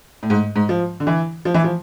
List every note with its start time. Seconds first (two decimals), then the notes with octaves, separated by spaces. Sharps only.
0.23 A2
0.30 G#2
0.56 G#2
0.69 F3
1.00 D3
1.07 E3
1.45 F3
1.54 E3
1.64 F3